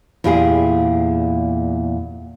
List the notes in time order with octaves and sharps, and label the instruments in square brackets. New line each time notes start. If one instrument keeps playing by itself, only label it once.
[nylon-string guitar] E2 A#2 E4 G4 G#4 F5